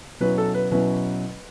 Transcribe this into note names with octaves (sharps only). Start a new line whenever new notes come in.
B2 F#3 C#4 E4 B4
A4
B4
B2 F#3 C#4 E4 B4